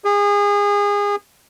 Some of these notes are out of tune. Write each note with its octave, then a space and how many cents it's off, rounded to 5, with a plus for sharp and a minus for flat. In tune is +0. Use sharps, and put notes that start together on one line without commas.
G#4 -30